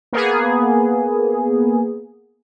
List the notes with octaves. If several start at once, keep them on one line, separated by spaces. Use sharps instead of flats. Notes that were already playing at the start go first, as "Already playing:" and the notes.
A#3 B3 G#4